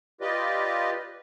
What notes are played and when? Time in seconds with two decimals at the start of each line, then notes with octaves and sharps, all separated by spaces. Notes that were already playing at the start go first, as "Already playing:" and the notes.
0.21 F4 G4 B4 D5 D#5